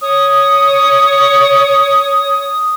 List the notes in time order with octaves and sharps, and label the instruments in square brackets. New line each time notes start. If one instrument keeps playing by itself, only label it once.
[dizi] C#5 [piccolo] D#6